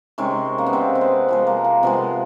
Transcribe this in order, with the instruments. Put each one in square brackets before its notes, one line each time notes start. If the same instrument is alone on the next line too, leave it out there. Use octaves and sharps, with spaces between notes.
[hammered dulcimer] C3 D#3 G#3 C#4
A#3
B3
C3 D#3 G#3 C4
C4
B3
C3 F3 G#3 B3
A#3
A#3
C3 F3 G#3 B3